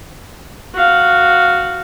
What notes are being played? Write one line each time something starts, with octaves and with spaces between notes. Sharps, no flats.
F#4 F5